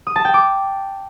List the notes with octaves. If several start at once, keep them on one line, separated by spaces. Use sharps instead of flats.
D#6
A5
G5
D6